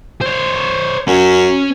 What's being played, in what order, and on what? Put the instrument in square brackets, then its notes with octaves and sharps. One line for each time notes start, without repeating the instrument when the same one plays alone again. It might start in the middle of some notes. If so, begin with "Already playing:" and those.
[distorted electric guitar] C5 C#5
[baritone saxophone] F#2 [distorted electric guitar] C#4